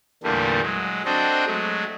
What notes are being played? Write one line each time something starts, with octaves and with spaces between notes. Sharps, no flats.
E2 A#2 D3 G3 A3 A#3
F#3 G#3
C4 D4 F#4 A4 D#5
F#3 G#3 A3